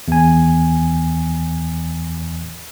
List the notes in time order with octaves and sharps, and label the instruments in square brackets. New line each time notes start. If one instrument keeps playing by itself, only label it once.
[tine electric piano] E2 G#5